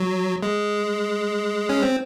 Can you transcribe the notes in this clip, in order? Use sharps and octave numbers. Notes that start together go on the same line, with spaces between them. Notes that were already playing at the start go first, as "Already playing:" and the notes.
Already playing: F#3
G#3
C#4
C4